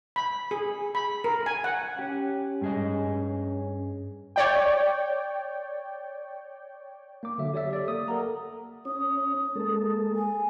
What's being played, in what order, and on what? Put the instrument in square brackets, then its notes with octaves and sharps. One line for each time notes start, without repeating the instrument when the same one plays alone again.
[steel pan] B5
G#4
B5
A#4
G#5
F#5
[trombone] C#4 [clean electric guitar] G4
[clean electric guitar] G2 G#4 D#5
[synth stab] C#5 D5 G5
[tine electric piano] A#3 D6
D3 F#3 E5
G4 C#5 D5 E5 E6
A4 D5
A#3 D#6
A4 A#4 F#5 A#5
[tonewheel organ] C#4 [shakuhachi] D#6
[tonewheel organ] G#3 A#3 A4
[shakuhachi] G#5